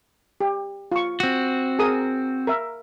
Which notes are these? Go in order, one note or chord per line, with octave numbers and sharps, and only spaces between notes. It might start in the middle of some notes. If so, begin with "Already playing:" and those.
G4
F4 C#6
C4 F#4
G#4 A#4 D#6
A#4 E5